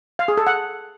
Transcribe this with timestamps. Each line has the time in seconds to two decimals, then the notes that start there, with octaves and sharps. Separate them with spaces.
0.19 F5
0.28 G#4
0.37 A4
0.47 F#5